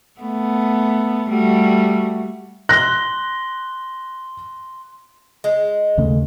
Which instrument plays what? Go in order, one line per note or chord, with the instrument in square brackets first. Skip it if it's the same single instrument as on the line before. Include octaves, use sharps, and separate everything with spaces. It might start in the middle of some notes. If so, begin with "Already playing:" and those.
[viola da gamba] A3 B3
G3 A3 F#4
[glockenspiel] C6 G7 [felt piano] F#6 A#6
[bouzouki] G#3
[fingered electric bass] D#2 C#3 A3